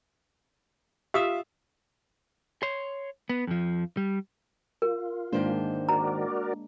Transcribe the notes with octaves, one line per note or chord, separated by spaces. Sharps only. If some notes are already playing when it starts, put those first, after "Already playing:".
F4 G4 E5 D#6
C#5 C6
B3
F2 F3
G3
F4 A#4
G#2 D#3 G#3 A#3 D4 C5
F#4 A#4 D5 A#5